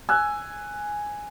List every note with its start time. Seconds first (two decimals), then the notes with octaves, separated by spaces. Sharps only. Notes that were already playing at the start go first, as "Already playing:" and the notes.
0.09 G#5 E6 F#6